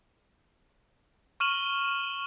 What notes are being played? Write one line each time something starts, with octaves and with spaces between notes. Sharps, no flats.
C#6 F6 D#7 E7 F#7